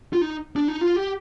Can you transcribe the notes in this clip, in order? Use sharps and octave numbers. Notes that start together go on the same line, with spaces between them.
F4
D#4
D4
D#4
F4
G4